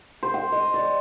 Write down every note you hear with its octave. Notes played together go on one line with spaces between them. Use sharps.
C5
G5
D#5
D5